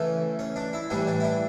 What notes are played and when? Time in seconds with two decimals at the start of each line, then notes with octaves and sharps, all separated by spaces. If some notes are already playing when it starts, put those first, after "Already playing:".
Already playing: C#3 E3 A3 C#4
0.39 C#4
0.56 D4
0.73 E4
0.90 A2 E3 G3 D4
1.07 D4
1.20 E4
1.24 D4